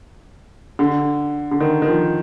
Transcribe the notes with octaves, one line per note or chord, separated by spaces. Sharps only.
D3
D3
D#3
D#3
F3